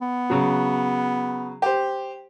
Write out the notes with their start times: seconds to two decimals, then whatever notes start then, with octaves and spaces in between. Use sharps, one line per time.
0.02 B3
0.30 C#3 F#3
1.62 G4 C5